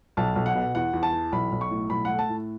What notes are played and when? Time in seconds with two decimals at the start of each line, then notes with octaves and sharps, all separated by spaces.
0.17 B1 A5
0.36 B1
0.46 F#5
0.55 B2
0.75 E2 F#5
0.93 E2
1.03 A5
1.13 E3
1.32 B1 B5
1.52 B1
1.61 C#6
1.71 A2
1.90 B1 B5
2.05 A3 F#5
2.19 A5
2.29 A2